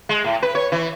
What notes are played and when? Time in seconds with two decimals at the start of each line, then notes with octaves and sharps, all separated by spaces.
0.09 G#3
0.24 A2
0.43 B4
0.55 C#5
0.72 E3